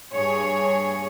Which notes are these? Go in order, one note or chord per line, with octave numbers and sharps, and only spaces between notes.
G2 G#4 C#5